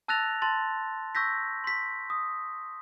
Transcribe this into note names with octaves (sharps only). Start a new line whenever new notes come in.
A5 E6 F#6 A6 A#6 F7
A5 C6 A6
C#6 E6 G6 A#6 B6
C6 B6
D#6